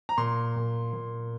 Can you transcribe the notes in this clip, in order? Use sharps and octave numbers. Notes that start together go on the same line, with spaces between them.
A#5
A#2 C6
A#2
A#2